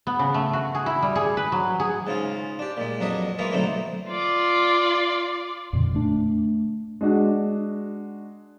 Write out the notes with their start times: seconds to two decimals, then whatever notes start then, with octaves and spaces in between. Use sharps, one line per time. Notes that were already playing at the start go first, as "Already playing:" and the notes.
0.07 B3
0.19 C#3
0.34 A3
0.53 F#4
0.75 G#4
0.86 E4
1.02 G3
1.16 G#4
1.37 B4
1.52 F#3
1.80 G#4
2.07 G#2 C#3 F4
2.59 D4 G4
2.77 A#2 G#3
3.00 F2 F#3 D4 G#4 B4 D#5
3.39 E3 G#3 A#3 F4 G#4 B4
3.52 B1 D3 F#3 A3 C4 D#4
4.08 F4 D5
5.73 F2 A#2 D3
5.94 A3 D4
7.01 G#3 D4 F#4